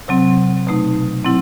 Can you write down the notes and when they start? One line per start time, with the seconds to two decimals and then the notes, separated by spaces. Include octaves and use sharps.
0.08 C3 F#3 C4
0.67 B2 A3 D#4
1.25 F#3 C4 E4